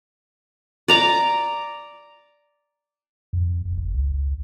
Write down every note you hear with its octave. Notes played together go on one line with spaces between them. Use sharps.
D5 A#5 D6
F2
D#1
F#1
C#2